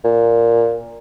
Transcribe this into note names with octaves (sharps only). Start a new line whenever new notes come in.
A#2